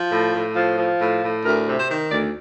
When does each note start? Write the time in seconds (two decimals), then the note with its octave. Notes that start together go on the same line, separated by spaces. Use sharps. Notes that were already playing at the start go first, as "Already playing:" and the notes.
Already playing: F3
0.11 A2
0.34 A2
0.56 F3
0.78 F3
1.00 A2
1.23 A2
1.45 D2 A#4
1.67 C3
1.79 C5
1.90 D#3
2.11 D2 D5